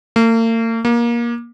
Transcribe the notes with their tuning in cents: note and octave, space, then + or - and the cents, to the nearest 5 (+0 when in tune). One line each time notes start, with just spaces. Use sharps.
A#3 -45
A#3 +20